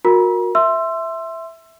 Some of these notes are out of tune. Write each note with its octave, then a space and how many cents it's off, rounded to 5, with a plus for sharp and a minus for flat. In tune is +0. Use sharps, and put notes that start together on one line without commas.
F#4 -30 A#4 +0 A#5 +40
E5 +0 C6 +5 E6 +25